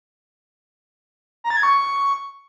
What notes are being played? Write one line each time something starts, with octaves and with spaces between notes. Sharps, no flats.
A#5
A6
G#6
C#6